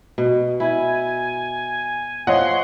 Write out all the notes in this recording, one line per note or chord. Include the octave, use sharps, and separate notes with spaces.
B2
E4 G#5
F3 C#5 D#5 F#5 C6